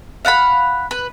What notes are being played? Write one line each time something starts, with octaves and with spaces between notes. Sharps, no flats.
F5 F#5 A5 B5
B4